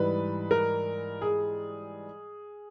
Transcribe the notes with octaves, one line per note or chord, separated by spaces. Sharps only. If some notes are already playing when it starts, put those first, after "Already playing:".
Already playing: G#2 E3 G3 B4
A#4
G#4